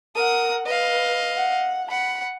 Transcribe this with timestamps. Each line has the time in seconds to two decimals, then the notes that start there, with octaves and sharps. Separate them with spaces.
0.16 A#4 F#5 D#6
0.66 B4 D#5 F5
1.37 F#5
1.91 F#5 B5